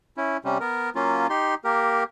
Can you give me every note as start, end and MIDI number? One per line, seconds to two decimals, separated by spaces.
0.17 0.37 61
0.17 0.37 64
0.45 0.58 48
0.45 0.58 55
0.45 0.58 61
0.60 0.90 59
0.60 0.90 70
0.95 1.27 54
0.95 1.27 58
0.95 1.27 61
0.95 1.27 65
1.30 1.55 63
1.30 1.55 67
1.30 1.55 84
1.64 2.04 58
1.64 2.04 67
1.64 2.04 70